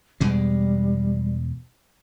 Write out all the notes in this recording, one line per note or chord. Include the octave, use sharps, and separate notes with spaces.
E2 B2 G3 G#3